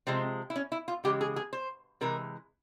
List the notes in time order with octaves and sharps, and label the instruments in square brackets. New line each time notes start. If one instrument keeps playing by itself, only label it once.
[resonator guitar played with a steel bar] C3 F3 G#3 C4
E4
C#4
E4
F4
C#3 E3 G#3 G4
G#4
G#4
C5
C3 E3 G#3 A#4